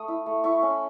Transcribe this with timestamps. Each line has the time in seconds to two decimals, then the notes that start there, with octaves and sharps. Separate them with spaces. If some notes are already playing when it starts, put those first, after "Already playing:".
Already playing: A3 D#6
0.08 E4
0.26 A3
0.44 E4 C#6
0.62 C#4